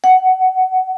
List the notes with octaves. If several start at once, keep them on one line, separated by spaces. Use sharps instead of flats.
F#5